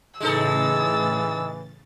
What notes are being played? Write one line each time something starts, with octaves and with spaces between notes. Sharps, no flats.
A2 C#3 E3 G#3 D#4 A4 E6 A6